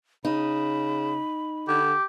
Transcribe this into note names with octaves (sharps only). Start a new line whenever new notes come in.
C#3 D#4 B5
D3 G4